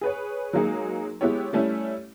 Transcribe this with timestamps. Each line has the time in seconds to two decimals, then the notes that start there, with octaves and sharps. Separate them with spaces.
0.01 G#4 B4 C#5
0.53 F#3 G#3 A#3 D#4 G#4
1.21 G#3 B3 E4 G4 C#5
1.53 G3 A3 C#4 E4